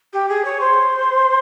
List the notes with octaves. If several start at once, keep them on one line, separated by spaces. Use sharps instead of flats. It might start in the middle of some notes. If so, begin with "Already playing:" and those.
G4
G#4
C#5
C5